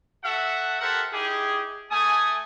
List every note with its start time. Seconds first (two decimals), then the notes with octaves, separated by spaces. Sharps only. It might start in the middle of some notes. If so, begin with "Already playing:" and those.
0.24 F#4 A4 E5 F#5
0.80 G4 A4 A#4 C5 E5 F#5
1.13 D#4 E4 G4 G#4
1.91 A3 G#5 D#6